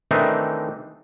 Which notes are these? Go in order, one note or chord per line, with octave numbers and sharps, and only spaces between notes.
D#3 E3 A3 C4 D4 D#4